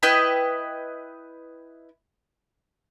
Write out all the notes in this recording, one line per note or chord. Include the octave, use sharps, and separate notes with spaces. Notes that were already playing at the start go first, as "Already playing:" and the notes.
E4 B4 D#5 G5